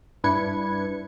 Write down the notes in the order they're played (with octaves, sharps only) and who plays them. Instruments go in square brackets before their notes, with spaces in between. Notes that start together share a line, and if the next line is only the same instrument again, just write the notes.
[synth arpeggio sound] G2 D4 E4 B4 G#6 C#7